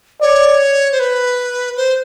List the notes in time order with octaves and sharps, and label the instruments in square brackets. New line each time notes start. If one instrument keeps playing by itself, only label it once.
[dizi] C#5 [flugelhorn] D5
[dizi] C5
B4
C5